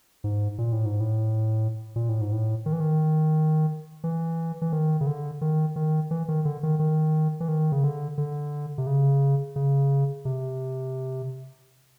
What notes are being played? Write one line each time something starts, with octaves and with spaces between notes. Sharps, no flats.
G#2
A#2
A2
G#2
A2
A#2
A2
G#2
A2
D#3
E3
D#3
E3
E3
D#3
C#3
D3
D#3
D#3
E3
D#3
D3
D#3
D#3
E3
D#3
C#3
D3
D3
C3
C#3
C#3
C3